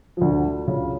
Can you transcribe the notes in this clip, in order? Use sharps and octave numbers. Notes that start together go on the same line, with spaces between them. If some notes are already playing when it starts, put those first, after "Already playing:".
F3
D2 D3
C#2 C#3